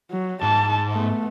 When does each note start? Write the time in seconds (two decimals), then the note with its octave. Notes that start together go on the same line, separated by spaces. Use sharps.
0.11 F#3
0.42 G#2 A5
0.91 A3 B3